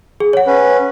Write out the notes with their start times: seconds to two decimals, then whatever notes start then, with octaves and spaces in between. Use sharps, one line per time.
0.20 G#4
0.33 C#5 F#5
0.47 C#4 B4